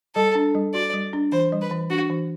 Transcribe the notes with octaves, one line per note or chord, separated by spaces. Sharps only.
G3 A4
D4
G3
F#4 D5
G3
D4
E3 C5
G3
B4
E3
D4 F#4
E3